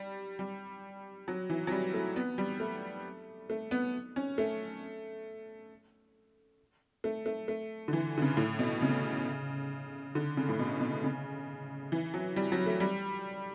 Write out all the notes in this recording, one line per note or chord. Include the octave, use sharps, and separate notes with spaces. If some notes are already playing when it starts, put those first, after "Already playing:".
Already playing: G3
G3
F#3
E3
F#3
G3
A3
B3
G3
A3
A3
B3
C#4
A3
A3
A3
A3
D3
E3
D3
C#3
A2
B2
C#3
D3
C#3
A2
B2
B2
C#3
E3
F#3
G3
F#3
A3
G3